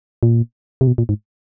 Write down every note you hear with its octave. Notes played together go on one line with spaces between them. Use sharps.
A#2
C3
B2
A#2
G#2